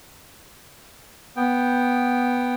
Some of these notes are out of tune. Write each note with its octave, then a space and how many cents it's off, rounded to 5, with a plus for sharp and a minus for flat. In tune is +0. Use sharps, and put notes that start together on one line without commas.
B3 +0 G5 +5